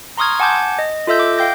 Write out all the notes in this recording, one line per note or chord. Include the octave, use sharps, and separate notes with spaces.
A#5 C6 C#6 D#6 F6 G#6
F#5 G#5 A5 D6 G6 G#6
D#5
F4 A4 D#5 E5 E6 G6
D6
F5 G5 G6 A#6